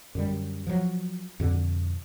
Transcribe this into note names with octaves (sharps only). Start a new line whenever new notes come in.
F#2 D3 G3
F3 F#3
F2 B2 D3